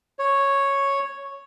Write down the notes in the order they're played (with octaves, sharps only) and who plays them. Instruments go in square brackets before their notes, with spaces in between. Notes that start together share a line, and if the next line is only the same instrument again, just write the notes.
[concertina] C#5